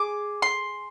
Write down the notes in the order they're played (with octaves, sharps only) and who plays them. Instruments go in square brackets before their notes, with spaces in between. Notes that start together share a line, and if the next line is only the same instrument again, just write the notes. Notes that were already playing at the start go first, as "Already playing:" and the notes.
Already playing: [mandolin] G#4 D6
C6